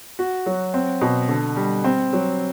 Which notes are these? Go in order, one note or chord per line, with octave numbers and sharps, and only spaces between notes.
F#4
F#3
C4
B2
D3
G3
C4
F#3